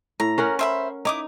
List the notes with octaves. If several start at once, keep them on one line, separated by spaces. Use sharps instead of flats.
A2 A#5
C#4 A#4 F#5
C5 E5 B5
D#4 E4 D6 D#6